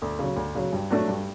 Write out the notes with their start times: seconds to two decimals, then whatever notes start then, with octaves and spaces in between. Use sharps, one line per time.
0.02 D2
0.19 C#3 F#3
0.36 D2
0.55 C#3 F#3
0.72 G2
0.90 F#3 A3 D4 F#4
1.08 G2